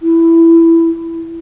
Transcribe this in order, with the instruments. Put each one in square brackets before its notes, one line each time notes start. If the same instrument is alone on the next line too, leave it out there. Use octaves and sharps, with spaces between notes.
[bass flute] E4